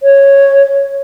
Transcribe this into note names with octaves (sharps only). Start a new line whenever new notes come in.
C#5